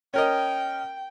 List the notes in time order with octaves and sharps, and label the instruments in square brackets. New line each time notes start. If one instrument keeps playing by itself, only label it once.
[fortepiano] C#4 A#4 D#5 [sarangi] G5